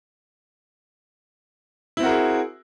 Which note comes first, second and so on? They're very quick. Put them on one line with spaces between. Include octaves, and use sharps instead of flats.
E4 C4 F#4 A#4 G#4